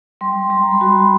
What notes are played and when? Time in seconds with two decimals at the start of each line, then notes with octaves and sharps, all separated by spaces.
0.21 G3 C6
0.50 G3 C6
0.61 A#5
0.72 B5
0.81 F#4 C6